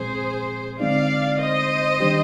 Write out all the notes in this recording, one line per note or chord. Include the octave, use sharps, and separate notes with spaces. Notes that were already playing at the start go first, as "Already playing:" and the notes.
Already playing: A#2 F3 G#3 C4 G#4 C5
D3 G#3 C4 D#4 D5 F5
C5 D#5
D#3 G3 D4 G4